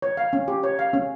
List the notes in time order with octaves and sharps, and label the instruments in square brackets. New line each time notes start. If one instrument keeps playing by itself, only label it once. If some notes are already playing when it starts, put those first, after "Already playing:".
[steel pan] C#5
F5
C#4
G4
C#5
F5
C#4